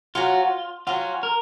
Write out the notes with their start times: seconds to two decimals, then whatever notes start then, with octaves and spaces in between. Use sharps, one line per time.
0.15 F#3 C#4 F4 F#4
0.87 F#3 C#4 F4 F#4
1.23 A#4